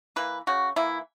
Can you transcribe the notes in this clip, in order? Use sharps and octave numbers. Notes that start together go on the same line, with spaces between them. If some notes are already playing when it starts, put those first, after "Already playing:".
E3 A#3 B4
C#3 F#4
E3 A#3 E4